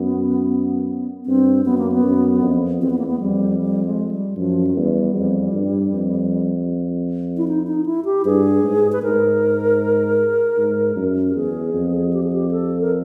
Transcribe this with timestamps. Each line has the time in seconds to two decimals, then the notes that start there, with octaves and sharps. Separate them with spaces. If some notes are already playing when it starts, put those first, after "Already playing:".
Already playing: F#2 B3
1.26 G2 C4
1.65 F#2 B3
1.78 A#3
1.92 B3
2.04 F#2
2.43 F2
2.82 E2 C4
2.90 B3
2.99 A#3
3.07 B3
3.20 F2 G3
3.60 G3
3.85 G#3
4.11 G3
4.37 F#2 F3
4.67 F#3
4.76 E2 G3
5.15 F2
5.53 G2
5.93 F2
7.37 E4
7.48 D#4
7.67 D#4
7.86 E4
8.05 G4
8.25 G2 G#4
8.64 G#2
8.92 B4
9.03 G#2 A#4
10.58 G#2
10.96 F#2
11.30 G4
11.35 E2 G#4
11.74 F2
12.13 G4
12.23 G#4
12.33 G4
12.51 A4
12.81 A#4